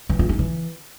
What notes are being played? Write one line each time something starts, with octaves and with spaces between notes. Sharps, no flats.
E3
F4
D#4
E3